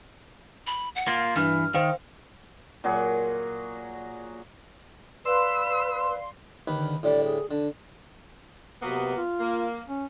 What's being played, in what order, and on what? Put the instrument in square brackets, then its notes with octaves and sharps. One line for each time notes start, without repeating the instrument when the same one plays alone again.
[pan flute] B5
F#5
[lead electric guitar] A#3 F4
[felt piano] G2 [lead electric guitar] E3 [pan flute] F6
[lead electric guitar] D#3 [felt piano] C5 F5
[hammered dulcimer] A#2 F#3 F#4 G#4
[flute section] B4 [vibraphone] D5 F5 [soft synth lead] C6 [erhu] E6
[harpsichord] D#2 D#3 B4 [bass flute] D3
[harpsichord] A2 D3 G3 [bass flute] D5
[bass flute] G#4
[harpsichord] D3 [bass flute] D4
[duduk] C3 [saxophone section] F#3 A#3 B3
[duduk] F4
[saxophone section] A#3
[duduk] C#4